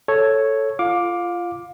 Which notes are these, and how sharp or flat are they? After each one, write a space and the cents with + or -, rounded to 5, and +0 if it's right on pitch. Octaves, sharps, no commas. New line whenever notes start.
A4 +0 C#5 +0
F4 -20 F5 +25 D6 +0